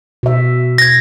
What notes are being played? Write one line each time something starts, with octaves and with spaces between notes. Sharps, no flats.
B2 E5
G#6 A#6